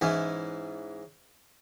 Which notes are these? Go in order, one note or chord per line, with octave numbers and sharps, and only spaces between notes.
G#2 E3 C#4